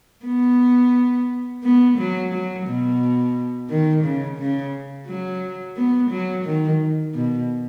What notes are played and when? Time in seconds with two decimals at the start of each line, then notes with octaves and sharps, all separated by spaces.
0.25 B3
1.63 B3
1.98 F#3
2.32 F#3
2.66 B2
3.69 D#3
4.04 C#3
4.39 C#3
5.07 F#3
5.76 B3
6.10 F#3
6.45 D#3
7.14 B2